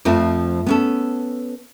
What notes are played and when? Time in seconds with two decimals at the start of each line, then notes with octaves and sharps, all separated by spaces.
0.05 F2 F3 A3 C4
0.66 B3 C#4 A4